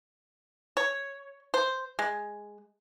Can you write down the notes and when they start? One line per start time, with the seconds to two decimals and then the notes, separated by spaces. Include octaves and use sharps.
0.77 C#5
1.54 C5
1.99 G#3